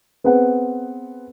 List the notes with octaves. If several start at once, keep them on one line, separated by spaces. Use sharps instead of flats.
B3 C4 G#4 B4 F#5